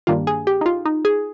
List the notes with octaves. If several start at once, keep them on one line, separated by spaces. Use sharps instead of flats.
G2 D#3 G3 A#3 D4 F4
G#4
G4
D#4
F4
D#4
G#4